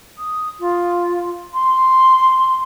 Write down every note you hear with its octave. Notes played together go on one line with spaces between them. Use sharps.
D#6
F4
C6